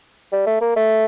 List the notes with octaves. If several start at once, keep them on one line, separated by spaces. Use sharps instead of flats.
G3
A3
A#3
A3